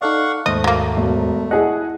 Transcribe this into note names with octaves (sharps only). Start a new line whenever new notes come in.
D#4 A4 D5 F5 F#5 C#6
D#2 G#2 A3 C5 D#5
F#3 A#3
E1
E4 G#4 D#5 F#5